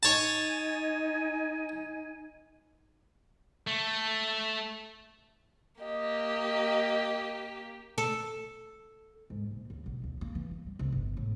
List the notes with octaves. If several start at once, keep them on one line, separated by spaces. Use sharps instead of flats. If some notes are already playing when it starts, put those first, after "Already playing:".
D#4 C#5 G#5 A5
A3
A#3 G4 D#5
A4
G#2
A#2
D#2
B1
D#2
A#3
E3
A#3
G3
C2
G1
A2